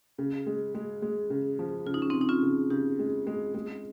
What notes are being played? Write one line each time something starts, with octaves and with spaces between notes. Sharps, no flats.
C#3
G#3
G#3
G#3
C#3
F3
C#3 F4
D#4
C#4
C4 D#4
C#3
D#4
C#4 F4
C#3
C#3 D#4 G4
G#3
G#3
G#3